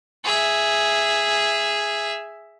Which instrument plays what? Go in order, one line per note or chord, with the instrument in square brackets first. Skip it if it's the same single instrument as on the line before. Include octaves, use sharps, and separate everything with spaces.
[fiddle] G#4 E5